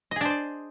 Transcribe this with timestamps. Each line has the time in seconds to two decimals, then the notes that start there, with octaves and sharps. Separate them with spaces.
0.11 D#5
0.16 G#4
0.21 D4
0.25 C5
0.30 D5